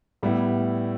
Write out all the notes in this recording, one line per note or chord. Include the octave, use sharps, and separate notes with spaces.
A2 G3 B3 E4